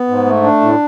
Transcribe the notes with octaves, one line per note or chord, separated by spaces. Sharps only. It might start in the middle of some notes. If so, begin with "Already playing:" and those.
Already playing: B3
G#2
A3
D4
A2